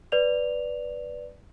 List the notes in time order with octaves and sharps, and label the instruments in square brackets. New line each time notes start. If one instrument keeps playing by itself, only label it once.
[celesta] B4 D5 F7